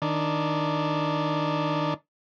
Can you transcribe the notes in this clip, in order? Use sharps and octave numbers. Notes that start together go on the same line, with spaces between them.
D#3 D4